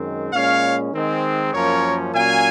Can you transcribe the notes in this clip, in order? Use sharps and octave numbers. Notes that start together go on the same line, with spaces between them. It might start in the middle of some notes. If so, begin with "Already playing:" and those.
Already playing: F#2 D#3 G#3 C4
A#2 G#3 C#4 C#5 F5
D#3 G#3 C4
F#2 F3 A#3 C#4 A#4 C#5
A#2 F#3 C#4 F5 G#5